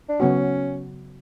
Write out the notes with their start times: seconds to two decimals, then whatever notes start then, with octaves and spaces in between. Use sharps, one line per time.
0.09 D4
0.20 C#3 F#3 B3 C#4 F#4